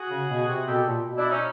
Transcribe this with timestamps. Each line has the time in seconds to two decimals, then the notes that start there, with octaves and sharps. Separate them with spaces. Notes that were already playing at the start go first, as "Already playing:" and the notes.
Already playing: F#4 G#4
0.10 C#3
0.29 B2
0.48 C3
0.67 B2 G4 A4
0.86 A#2
1.05 B2
1.18 D4 E4
1.30 C#4 D#4